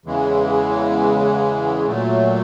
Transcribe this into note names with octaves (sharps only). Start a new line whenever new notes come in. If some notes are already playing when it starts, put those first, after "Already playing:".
E2 C#3 E3 G#3
A#2 F#3 A3